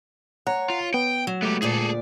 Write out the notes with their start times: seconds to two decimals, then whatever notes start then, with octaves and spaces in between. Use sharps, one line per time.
0.47 C#5 F#5 A#5
0.70 F4
0.94 B3 G5
1.27 F#3
1.42 G#3 A3 B3 G4
1.62 D2 A#2 G#4 A4 D5